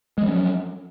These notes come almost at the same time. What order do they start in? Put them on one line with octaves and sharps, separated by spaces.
G#3 F3 C#4 F#3